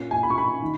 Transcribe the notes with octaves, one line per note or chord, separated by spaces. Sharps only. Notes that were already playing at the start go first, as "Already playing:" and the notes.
Already playing: A#2 A#3 C#4
G#5
B5
C#6
B5
D#3